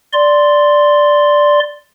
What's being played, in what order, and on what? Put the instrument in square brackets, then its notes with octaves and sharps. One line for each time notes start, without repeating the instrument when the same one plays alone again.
[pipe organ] D5 C6